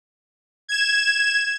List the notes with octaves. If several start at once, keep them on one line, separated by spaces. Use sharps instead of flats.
G#6 E7